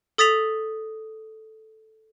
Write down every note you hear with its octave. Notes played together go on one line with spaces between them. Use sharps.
A4 D#6 A6 B6 F7